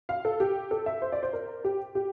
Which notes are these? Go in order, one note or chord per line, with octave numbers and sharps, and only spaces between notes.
F5
A4
G4
A4
E5
C5
D5
C5
A#4
G4
G4